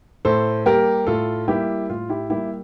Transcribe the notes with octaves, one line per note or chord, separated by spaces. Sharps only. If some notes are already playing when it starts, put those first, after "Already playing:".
A2 A4 C5
G3 A#3 G4 A#4
A2 F4 A4
G3 A#3 E4 G4
A2 F4
E4 G4
G3 A#3 E4 G4